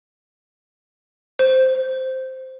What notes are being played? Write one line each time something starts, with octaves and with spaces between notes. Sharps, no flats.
C5